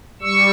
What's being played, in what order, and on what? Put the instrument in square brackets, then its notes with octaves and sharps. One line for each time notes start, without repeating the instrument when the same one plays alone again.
[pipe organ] G3 C#6 E6